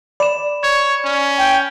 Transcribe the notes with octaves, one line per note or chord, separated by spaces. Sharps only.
D5 B5 E7
C#5 G#6
C#4
G5